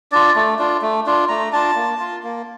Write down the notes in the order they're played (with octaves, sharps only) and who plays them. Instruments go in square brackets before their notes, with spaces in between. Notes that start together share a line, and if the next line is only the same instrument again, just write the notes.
[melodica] D4 F4 D5
A3
D4 F4
A3
D4 F4
A3 A#5
D4 F4 A5
A#3
F4
A#3